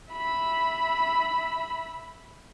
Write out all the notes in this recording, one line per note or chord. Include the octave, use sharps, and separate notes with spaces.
E5 B5